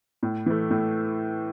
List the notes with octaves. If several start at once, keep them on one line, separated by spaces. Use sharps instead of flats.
A2
E3 A3
A2